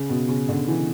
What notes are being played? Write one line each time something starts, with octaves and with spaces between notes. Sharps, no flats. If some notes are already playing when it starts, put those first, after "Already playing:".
Already playing: C#3
B2
C#3
D3
E3